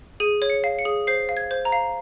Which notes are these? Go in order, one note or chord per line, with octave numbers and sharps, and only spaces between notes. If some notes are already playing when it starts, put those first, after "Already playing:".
G#4 D#7
C#5
C#7
F5
C#7
G#4
C5 C7
F5
G#6
C5
A#5
F5